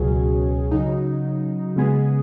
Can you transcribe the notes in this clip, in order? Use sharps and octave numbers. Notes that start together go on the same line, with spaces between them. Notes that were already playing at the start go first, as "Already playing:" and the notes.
Already playing: C#2 B2 F#3 C#4 G#4
C#3 F#3 D#4
C#3 G#3 B3 G#4